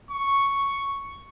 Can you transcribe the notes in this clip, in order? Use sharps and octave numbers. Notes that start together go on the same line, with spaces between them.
C#6